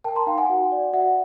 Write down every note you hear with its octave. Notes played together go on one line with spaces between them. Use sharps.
A#4 G5 A5
A#5 C6
D#4 F5 G5
F#5 G#5
F#4
D5
F#4 E5 F#5